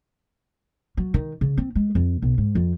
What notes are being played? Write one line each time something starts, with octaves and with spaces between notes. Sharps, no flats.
F#3
D#3
C#3
C4
G#3
F2
B1
G#2
F2